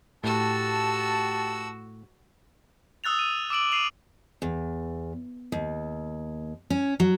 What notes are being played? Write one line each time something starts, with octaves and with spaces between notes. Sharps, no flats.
A2 F#4 G4 A5 E6
D#6 E6 F#6 A6 F7
D#7
D6 E6 D7 F#7
C7 D#7 F7 F#7
E2
D#2
C#4
F#3